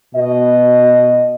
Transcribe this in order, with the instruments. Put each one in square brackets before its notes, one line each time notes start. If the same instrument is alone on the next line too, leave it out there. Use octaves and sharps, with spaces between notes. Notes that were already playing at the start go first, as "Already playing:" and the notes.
[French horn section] B2 D#5